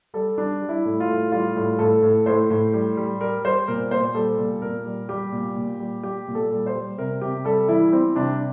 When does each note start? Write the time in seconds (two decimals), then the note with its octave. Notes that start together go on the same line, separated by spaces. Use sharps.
0.14 G3 A4
0.38 G3 D4
0.61 G3
0.69 E4
0.85 A2
1.00 F4
1.08 A2
1.32 G3 F4
1.56 A2
1.79 A2 A4
2.02 A2
2.26 A2 C5
2.50 A2
2.73 G3
2.97 G3
3.20 G3 A#4
3.44 G3 C5
3.68 A#2 A#4
3.91 A#2 C5
4.15 G3 A4
4.39 A#2
4.62 A#2 A#4
4.86 G3
5.09 G3 G4
5.32 A#2
5.56 A#2
5.80 G3
6.03 G3 G4
6.28 A#2
6.35 A4
6.51 G3
6.66 C5
6.75 G3
6.98 C3 A#4
7.21 C3 G4
7.45 G3 A4
7.68 E3 E4
7.92 G3 C4
8.15 C3 D4